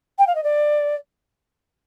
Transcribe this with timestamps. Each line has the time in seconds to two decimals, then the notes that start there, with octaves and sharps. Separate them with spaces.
0.18 G5
0.27 F5
0.35 D#5
0.43 D5